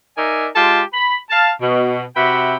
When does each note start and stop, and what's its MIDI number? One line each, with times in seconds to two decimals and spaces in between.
0.17 0.47 63
0.17 0.47 70
0.17 0.47 74
0.17 0.47 76
0.17 0.47 80
0.56 0.82 56
0.56 0.82 65
0.56 0.82 67
0.56 0.82 79
0.56 0.82 81
0.93 1.17 83
1.30 1.51 77
1.30 1.51 81
1.61 2.03 47
2.16 2.57 48
2.16 2.57 66
2.16 2.57 76
2.16 2.57 79
2.16 2.57 83